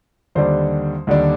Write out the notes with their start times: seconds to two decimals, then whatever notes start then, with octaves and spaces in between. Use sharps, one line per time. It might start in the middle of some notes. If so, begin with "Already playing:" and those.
0.35 D#2 D3 G3 D4 C5
1.07 D#2 D3 G3 D4